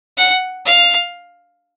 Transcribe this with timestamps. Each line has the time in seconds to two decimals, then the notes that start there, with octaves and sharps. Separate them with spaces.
0.17 F#5
0.66 F5